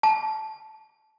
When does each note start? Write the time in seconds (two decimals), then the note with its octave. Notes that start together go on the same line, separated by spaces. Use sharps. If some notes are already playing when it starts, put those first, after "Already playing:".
0.03 A5